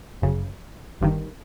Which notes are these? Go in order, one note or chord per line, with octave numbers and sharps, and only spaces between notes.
G1 F#2 C#3
G1 G2 D#3